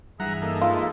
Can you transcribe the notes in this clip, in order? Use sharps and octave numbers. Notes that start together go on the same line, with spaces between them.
G2 E3 G#4 E5 F#5 A#5
A#3 D#4 A4
G#3 E4 F4